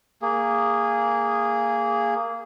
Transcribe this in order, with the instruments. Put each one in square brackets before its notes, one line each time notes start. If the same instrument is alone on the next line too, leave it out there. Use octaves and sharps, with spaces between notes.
[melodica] A#3 G#4